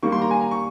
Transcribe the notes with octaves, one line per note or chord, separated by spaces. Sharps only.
D#3 G3 A#3 C#6
C6
A#5
G#5
A#5
C#6